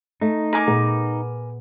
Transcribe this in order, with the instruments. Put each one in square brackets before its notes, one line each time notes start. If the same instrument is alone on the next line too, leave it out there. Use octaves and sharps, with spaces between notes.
[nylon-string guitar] A3 [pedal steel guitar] D#4
[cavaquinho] A#4 G#5 D6
[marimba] A#2 [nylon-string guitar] B3